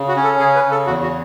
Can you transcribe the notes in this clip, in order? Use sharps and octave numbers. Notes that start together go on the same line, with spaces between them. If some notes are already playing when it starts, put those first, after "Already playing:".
Already playing: C#3
F#4
C#4
A4
C#3 G#4
B4
C#3
A4
E2 F#4
F#4